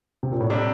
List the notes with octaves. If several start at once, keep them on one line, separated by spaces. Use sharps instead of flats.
C3
A#2
A2
C3 G3 D4